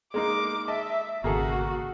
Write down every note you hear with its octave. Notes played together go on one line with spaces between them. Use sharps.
G#3 A#3 D#4 D6
D#5 E5 A5
G#1 C#3 A#3 F#4 G#4 A4